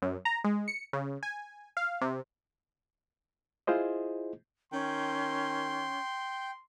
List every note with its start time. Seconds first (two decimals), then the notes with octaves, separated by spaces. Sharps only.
0.02 F#2
0.25 A#5
0.44 G#3
0.68 C#7
0.93 C#3
1.23 G#5
1.77 F5
2.01 C3
3.67 E4 F4 G#4 C5 D#5
4.72 D#3 C#4 G5 C6